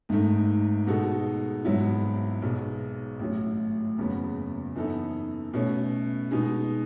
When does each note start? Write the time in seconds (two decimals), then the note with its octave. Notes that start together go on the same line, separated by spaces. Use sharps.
0.09 G#1 G#2 D#3 A3 D#4
0.87 B2 G#3 D#4 F#4 A4
1.65 G#1 G#2 F#3 B3 E4
2.42 B1 B2 G#3
3.19 A1 A2 F#3
3.98 F#1 E2 C#3 F#3 B3
4.76 F#2 E3 B3 D#4 A4
5.54 B2 A3 C#4
6.31 B2 G#3 D#4 G#4